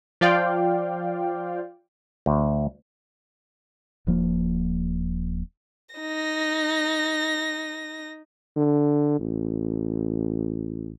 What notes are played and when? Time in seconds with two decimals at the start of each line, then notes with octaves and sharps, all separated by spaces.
0.21 F3 F4 D5 F5 G5
2.26 D2
4.07 D#1 F3 A#3
5.95 D#4 A#6
8.56 D3
9.19 A1